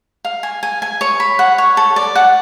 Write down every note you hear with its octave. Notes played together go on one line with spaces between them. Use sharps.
F5
G#5
G#5
G#5
C#5
B5
F#5
C#5
A4
D5
F#5